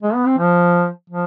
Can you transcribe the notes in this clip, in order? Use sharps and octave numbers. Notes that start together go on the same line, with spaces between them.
G#3
B3
C4
F3
F3